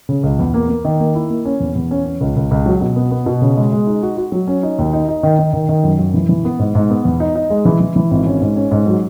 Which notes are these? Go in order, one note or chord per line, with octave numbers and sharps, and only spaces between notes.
C#3
C#2
E2
A#3
A#3
D#3
A#3
E4
A#3
C#4
E2
E2
C#4
C#4
C#2
C#2
C#2
F#3
B2
B3
B3
B2
C#3
G#3
G#3
D#4
F#4
F#4
F#3
C#4
D#4
D#2
D#4
D#4
D#3
D#3
D#3
D#3
F#2
F#2
E3
E3
B3
G#2
G#2
B3
E2
D#4
D#4
G#3
E3
E3
E3
G#1
C#4
G#2
C#4
G#2
F#3